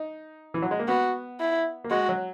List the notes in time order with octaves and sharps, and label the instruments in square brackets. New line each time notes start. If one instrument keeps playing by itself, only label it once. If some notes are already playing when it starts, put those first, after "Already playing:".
Already playing: [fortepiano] D#4
E3
F#3
G#3
A#3
[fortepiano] B3 [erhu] F#4
[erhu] E4
[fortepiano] A#3
[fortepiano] G#3 [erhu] F#4
[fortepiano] F#3